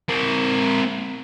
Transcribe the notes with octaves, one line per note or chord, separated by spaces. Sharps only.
C4 A#4